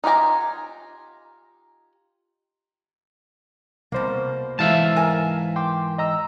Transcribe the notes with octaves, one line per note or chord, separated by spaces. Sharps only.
D#4 F4 G4 G#5 A#5
C2 B2 A#3 C5
G#2 E3 E5 F5 A5
A#4 G#5
G5 C6 D6
D#5 A#5 E6